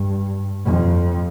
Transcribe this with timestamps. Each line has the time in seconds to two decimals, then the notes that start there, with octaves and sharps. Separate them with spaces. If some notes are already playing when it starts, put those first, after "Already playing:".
Already playing: G2
0.65 F2